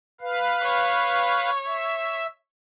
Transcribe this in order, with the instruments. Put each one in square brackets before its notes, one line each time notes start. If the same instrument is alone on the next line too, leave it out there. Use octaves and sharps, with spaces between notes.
[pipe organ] B4 F5
[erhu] C#5
[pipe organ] E5